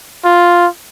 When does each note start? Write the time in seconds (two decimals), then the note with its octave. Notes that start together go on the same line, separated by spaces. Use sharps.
0.25 F4